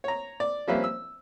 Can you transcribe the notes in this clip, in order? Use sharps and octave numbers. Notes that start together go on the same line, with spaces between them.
C#5 A#5
D5
F3 G3 A#3 C#4 B4 E5
E6